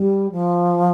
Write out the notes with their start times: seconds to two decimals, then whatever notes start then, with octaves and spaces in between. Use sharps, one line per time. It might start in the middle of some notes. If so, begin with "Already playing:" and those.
Already playing: G3
0.31 F3